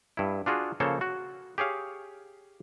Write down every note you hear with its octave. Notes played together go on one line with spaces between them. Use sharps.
G2 E4
D4 F4 F#4 G#4
C#3 F3 A#3 A4 C5 C#5
F#4
G4 G#4 C#5 F5